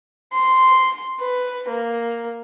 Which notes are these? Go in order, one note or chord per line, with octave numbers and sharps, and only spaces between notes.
C6
B4
A#3